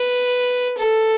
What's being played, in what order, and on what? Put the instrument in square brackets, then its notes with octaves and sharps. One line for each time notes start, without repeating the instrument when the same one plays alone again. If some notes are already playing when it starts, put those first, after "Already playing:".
Already playing: [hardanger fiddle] B4
A4